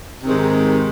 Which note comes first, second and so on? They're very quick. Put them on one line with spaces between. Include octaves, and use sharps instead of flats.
C3 D#3 G#2